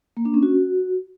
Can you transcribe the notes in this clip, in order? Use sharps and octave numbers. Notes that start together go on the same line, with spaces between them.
A#3
D4
C#4
F#4